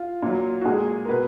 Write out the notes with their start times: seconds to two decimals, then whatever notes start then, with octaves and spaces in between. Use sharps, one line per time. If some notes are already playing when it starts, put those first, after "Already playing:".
Already playing: F4
0.22 A#2 F#3
0.61 F#4
0.65 A#2 G#3 G#4
1.05 A#4
1.09 B2 B4